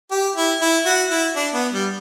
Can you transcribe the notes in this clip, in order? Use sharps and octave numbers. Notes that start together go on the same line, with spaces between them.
G4
E4
E4
F#4
E4
D4
B3
G3